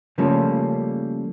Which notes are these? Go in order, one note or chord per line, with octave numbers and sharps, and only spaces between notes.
C#3 F3 G3 A3 A#3 C#4